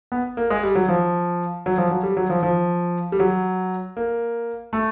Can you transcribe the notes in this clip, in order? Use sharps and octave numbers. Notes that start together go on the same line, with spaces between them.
B3
A#3
G#3
G3
F#3
F3
F#3
F3
F#3
G3
F#3
F3
F3
G3
F#3
A#3
A3